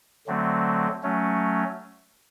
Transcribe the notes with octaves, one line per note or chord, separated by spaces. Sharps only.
D3 F#3 A3 C4
F#3 A3 C#4